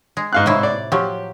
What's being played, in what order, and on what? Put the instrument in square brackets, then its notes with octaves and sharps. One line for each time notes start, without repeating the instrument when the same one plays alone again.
[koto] G#3
[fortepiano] G#2 F5 F#6
[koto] A2 C3 E4
[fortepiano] D5
[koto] F3 F#3 [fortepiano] G4